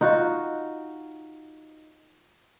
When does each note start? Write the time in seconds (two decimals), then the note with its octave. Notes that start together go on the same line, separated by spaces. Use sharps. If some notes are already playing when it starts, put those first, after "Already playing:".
0.01 D#4 F4 F#4